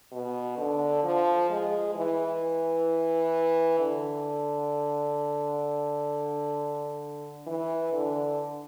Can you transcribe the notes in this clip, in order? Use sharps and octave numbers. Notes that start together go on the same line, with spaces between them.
B2
D3
F3
G#3
E3
D3
E3
D3